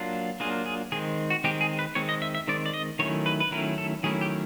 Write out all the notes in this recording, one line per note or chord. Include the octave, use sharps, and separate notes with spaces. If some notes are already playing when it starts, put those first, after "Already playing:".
Already playing: F#3 A#3 D4 F4
F#3 A#3 D4 F4 G#4
G#4
D#3 G#3 C4 G#4
F#4
D#3 G#3 C4 G4
G#4
B4
D#3 G#3 C4 C#5
D#5
E5
E5
D#3 G#3 C4 D5
D5
D#5
D#3 F#3 A3 C#4 E4 C#5
B4
B4
D#3 F#3 A3 C#4 E4 A#4
A4
D#3 F#3 A3 C#4 E4 G#4
G4